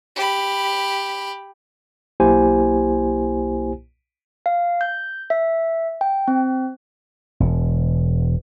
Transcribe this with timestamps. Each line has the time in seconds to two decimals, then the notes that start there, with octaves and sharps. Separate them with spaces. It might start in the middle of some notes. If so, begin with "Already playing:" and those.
0.16 G4 B5
2.20 B1 A#3 E4 G4 C5 G#5
4.46 F5
4.81 G6
5.30 E5
6.01 G5
6.28 C4
7.40 E1